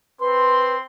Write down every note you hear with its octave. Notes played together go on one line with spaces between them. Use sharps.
C4 B4 C6